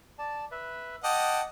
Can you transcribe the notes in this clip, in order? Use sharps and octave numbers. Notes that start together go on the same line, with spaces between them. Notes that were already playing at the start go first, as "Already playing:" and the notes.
D5 A5
B4 E5
D#5 F#5 G5 A5 D6